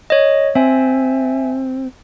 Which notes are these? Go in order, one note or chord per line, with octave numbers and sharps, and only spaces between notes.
C#5 D#5
C4 E5 G#5